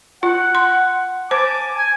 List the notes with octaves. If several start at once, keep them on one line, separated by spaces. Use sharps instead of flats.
F4 F#5
C6
C5 G#5 A5 D6
G#5